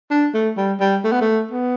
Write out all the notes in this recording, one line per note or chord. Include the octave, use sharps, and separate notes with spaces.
D4
A3
G3
G3
A3
B3
A3
B3